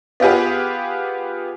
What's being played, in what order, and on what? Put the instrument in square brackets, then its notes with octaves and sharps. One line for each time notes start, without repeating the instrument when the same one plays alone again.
[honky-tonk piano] B3 F4 G4 G#4 B4